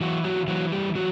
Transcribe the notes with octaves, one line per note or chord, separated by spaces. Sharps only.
E3 F#3 F#4
F#3 F#4
E3 F#3 F#4
G3 G4
E3 F#3 F#4